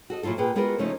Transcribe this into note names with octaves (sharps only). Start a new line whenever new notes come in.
F#4 A4 D#5
A#2 F#3 E4 F4 A4
A#2 G#4 B4 G5
G#3 B3 F4 F#4 A#4 B4
C#3 F3 A3 A#3 C#4 D#4